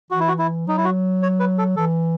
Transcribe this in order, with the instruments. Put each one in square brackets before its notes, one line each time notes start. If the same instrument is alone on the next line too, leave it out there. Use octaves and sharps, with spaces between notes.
[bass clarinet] E3 [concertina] F#4
[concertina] E4
F#4
E4
[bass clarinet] F#3 [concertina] D#4
[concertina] E4
F#4
C#5
B4
A4
[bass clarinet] E3 [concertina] A4